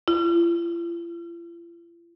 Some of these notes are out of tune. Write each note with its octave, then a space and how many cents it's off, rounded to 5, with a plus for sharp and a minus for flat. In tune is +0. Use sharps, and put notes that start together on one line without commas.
F4 -45